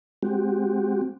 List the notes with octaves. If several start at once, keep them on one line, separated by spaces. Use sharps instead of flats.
G#3 C4 F#4 G4